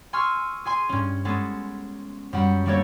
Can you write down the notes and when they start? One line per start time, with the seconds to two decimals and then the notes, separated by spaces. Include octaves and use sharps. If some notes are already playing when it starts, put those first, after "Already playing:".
0.13 G#5 C6 C#6 E6 F6
0.65 G#4 G#5 C6
0.89 G2 C#4
1.25 G#3 B3 C#4 A4
2.33 F#2 G3 F#5
2.66 G3 A3 A#3 D4 A4 C#5